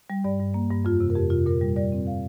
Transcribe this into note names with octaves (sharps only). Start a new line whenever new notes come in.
G3
G2 D5
G2
A#3
G2
F2 F4
C3
A#4
F2 G4
C3 F4
A#2 A#4
G3
G3 D5
C4
F5